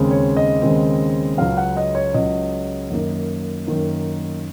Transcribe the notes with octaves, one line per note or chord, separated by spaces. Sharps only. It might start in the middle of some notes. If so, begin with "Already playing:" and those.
Already playing: D#2 C#3 G#3 C4
C#5
D#5
D#2 C#3 G#3 C4
C#2 C#3 F#3 F5
F#5
D#5
C#5
C#2 C#3 F#3 D#5
F#2 D#3 A#3 D#4
F#2 D#3 A#3 D#4